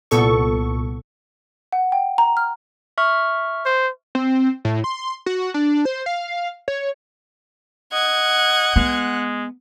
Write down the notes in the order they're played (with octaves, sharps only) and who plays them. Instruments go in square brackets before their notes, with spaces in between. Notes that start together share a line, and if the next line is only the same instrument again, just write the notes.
[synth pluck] C2 A#2 B3 A4 C#6
[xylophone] F#5
G5
A#5
F6
[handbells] E5 C#6 F6
[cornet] C5
[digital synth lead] C4
A2
C6
F#4
D4
C5
F5
C#5
[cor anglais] D#5 [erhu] F#5 [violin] G#6
[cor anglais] G#3 [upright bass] B3